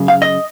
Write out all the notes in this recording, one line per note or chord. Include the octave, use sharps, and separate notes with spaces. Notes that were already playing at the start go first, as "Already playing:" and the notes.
Already playing: F#2 C#3
F5
D#5